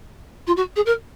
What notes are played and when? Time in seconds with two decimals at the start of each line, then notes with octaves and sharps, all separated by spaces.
0.47 F4
0.56 F#4
0.76 G#4
0.86 A#4